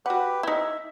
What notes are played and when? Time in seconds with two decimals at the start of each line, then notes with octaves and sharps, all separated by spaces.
0.06 F#4 G4 B4 F#5
0.43 D#4 E4 E5